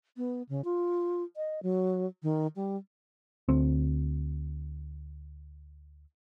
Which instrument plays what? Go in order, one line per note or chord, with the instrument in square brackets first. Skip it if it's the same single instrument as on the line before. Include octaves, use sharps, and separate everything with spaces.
[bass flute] B3
C#3
F4
D#5
F#3
D#3
G3
[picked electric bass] D2 C4